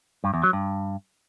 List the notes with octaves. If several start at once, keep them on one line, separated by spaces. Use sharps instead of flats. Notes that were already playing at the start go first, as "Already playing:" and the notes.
G2
E2
F#3
G2